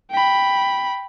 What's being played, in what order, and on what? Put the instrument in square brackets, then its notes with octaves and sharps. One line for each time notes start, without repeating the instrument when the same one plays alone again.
[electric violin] G5 B5